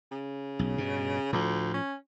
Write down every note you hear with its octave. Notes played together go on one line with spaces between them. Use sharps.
C#3
B1
G2 B2
D2 A2 F3
C#4